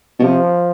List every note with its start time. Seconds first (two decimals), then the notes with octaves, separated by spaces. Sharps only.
0.19 B2
0.23 C3 F3